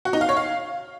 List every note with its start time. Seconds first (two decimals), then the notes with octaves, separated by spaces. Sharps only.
0.05 F#4
0.13 D#4
0.21 F5
0.29 C#5
0.37 F5